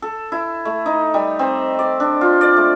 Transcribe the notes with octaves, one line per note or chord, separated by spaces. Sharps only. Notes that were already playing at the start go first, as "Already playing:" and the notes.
A4
E4
A3
D#4
G3
C4
D5
D4
F4
D5
A3